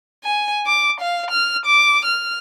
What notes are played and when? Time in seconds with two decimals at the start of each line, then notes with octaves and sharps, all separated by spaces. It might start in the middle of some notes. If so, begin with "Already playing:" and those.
0.25 G#5
0.66 D6
1.00 F5
1.31 F6
1.66 D6
2.05 F6